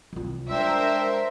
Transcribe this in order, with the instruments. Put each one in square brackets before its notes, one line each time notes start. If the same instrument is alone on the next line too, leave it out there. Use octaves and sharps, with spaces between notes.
[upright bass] C2 F4
[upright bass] G#3 [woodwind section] D4 G5 E6 [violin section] A#4 C5 E5